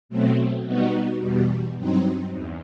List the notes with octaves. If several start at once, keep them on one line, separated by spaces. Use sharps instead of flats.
B2 F#3 A3 C4
B2 G3 B3 D#4 F#4
E2 B2 G3
G2 F#3 C4 D#4
E2